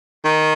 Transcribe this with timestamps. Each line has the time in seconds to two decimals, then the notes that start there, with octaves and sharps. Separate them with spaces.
0.25 D#3